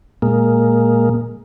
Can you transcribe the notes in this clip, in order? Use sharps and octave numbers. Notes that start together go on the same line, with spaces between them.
A#2 G#3 A#3